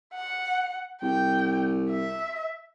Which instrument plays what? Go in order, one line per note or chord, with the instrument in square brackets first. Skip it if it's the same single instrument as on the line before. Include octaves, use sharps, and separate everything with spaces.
[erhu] F#5
[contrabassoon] C2 [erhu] G5
[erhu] E5